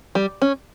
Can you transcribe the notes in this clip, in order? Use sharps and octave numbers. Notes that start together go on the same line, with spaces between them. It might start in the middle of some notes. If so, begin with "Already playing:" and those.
G3
C#4